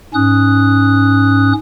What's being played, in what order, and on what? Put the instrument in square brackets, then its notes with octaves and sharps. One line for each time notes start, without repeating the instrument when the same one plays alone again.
[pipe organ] G#2 C#4 D#6 F#6